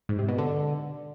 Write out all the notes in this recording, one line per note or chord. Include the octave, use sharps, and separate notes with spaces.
G#2
C3
B2
D3